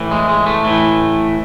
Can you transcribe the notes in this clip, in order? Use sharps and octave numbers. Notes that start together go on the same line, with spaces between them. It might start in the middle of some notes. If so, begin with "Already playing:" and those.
Already playing: A2 E3
G#3
G#3
A3
A2 E3